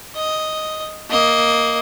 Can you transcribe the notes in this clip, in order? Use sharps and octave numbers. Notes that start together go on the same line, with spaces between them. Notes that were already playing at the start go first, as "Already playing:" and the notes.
D#5
A#3 D#5